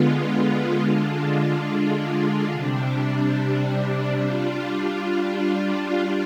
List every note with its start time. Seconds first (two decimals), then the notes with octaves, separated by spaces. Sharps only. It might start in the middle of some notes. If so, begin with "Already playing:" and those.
Already playing: D3 G#3 B3 F4
0.79 D3 G#3 D4 F4
2.51 C3 G3 D4
4.24 G3 D4 F4